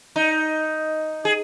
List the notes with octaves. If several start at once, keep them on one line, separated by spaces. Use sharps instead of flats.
D#4
G#4